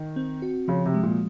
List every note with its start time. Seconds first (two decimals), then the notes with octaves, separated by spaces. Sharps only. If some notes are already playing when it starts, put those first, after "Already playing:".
Already playing: D#3
0.16 C4
0.42 F#4
0.68 C#3 F3
0.86 C3
0.94 G#3
1.03 A#2